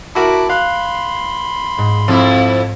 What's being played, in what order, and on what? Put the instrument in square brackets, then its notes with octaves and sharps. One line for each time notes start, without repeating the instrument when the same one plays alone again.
[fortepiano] E4 F#4 A#4 [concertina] A5 B5 D6
[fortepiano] F5 [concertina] B5 C6 [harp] F#6
[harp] G#2
[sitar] F2 E4